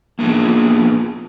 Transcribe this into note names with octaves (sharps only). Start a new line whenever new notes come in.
A#3 B3 D4 F4 G#4